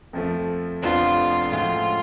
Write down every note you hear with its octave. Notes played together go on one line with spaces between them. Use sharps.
F2 F3 A3
F1 F2 F3 B3 D4 F4
A2 F3 G#3 C#4 F4 F#4